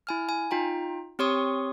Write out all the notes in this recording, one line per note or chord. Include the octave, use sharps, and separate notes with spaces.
E4 G#5 F6
G#5
D#4 F4 G5 A#5
C4 G4 C#5 C6 C#6 D#6